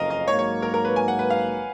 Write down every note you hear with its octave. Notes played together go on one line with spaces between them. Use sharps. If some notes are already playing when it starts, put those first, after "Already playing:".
Already playing: F#1 F2 C#3 A#4 D#5 F5
D#5
G#2 F#3 A#3 C#5
C#5
A#4
A#4
B4
G#5
F#5
B4
F5